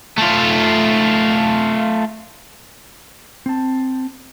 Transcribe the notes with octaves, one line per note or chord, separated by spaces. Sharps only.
A3 F4
C4 A5